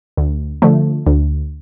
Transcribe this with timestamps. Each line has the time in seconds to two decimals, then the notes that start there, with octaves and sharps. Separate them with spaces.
0.17 D2
0.62 D3 F3 A3
1.07 D2